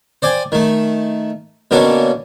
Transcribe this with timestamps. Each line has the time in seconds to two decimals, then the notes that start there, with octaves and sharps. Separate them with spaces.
0.22 C5 D5 G5 G#5
0.52 D#3 A3
1.71 B2 D3 A#3 C#4 A4